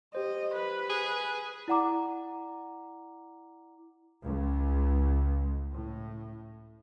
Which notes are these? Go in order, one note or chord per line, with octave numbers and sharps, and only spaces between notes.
G4 C5 D#5
B4
G#4
E4 D5 F#5 A#5 D6
C#2
A2